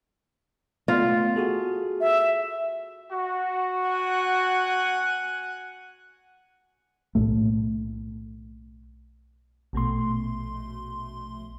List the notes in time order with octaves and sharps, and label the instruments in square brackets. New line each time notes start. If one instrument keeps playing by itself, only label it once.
[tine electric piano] A3 B3 [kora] F4
[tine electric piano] F#4 G#4 A4
[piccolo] E5
[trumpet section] F#4
[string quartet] F#5 G#5 F#6
[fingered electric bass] B1 A2 A3
[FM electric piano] A#1 B2 A3 C6